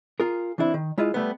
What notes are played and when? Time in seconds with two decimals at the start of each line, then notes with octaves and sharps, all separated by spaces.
0.20 F4 G#4 A#4
0.58 E3 C4 D4 E4
0.74 D#3
0.98 G#3 E4 F4 D#5
1.14 G3 A3 B3